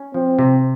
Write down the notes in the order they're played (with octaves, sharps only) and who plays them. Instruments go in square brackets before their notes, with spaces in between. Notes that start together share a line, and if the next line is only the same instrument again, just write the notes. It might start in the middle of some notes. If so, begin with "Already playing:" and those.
Already playing: [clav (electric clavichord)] C#4
[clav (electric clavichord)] F3 [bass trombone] C4
[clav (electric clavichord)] C3